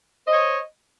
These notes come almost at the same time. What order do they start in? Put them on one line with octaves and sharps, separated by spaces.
C5 D#5 C#5